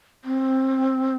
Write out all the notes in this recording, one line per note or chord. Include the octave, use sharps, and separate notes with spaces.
C4